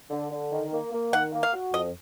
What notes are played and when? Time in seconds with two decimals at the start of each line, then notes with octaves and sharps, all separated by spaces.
0.10 D3
0.31 D3
0.52 D#3
0.72 A#3
0.92 A#3
1.13 D#3 F#5
1.32 A#3
1.43 F5
1.53 F#4
1.73 F2 D#5